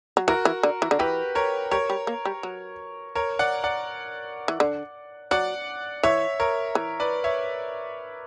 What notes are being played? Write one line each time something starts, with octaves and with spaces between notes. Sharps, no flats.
F#3
E3 F#4 A#4
E3
D3
E3
D3
E3 G4 B4
A#4 C#5
G3 A#4 C#5
G3
A#3
G3
F#3
A#4 C#5
D5 F#5
D5 F#5
E3
D3
F#3 D5 F#5
E3 C#5 E5
A#4 C#5
E3
B4 D5
C#5 E5